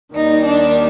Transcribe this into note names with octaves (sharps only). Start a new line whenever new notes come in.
D#2 D#3 G3 D#4
D4